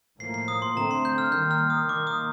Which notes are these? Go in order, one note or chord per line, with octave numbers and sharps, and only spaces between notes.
A2 F3 A#3 C7
C7
D#6
C6
D3 A3 C4 A#5
C6
G6
F6
D#3 G3 A#3 G6
F6
D#6
D#3 A#3 D6
D#6